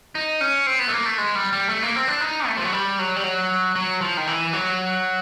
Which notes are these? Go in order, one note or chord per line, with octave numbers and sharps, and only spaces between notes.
D#4
C#4
C4
B3
A3
A#3
A3
G#3
G3
G3
A3
A#3
C4
D4
D#4
A3
F3
F#3
G3
F#3
G3
F#3
F#3
F3
D#3
E3
F#3